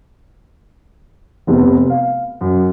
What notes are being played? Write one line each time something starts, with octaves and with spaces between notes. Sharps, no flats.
F1 C3 B3
F5
F#2